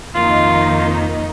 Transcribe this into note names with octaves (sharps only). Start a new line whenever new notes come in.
F2 D#3 A#3 D#4 F4